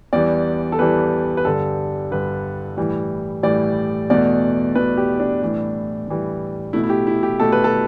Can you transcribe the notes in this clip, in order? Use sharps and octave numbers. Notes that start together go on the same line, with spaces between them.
E2 E3 G3 D5
A4
E2 E3 G3 B4
B4
G2 D3 G3 A4
G2 D3 G3 B4
A2 E3 G3
A2 E3 G3 D5
E2 B2 A3 D5
E2 B2 A3 B4
G4
D4
A2 E3 G3
A2 E3 G3
B2 A3 E4
E4
G4
E4
G4
B2 A3 A4
B4
A4